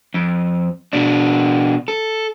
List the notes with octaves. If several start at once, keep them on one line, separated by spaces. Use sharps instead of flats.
F2
B2 D4
A4